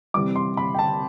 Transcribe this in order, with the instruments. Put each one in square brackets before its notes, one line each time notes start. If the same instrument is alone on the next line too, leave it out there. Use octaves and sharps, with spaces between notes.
[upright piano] C3 E3 G3 D6
C6
B5
G5
A5